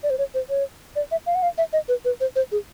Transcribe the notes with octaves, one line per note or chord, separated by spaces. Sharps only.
D5
C5
C#5
C5
C#5
D5
E5
F5
F#5
F5
E5
D#5
B4
B4
C5
C5
G#4